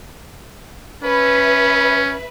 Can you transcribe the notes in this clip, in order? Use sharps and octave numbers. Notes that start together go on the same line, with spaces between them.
C#4 B4 E5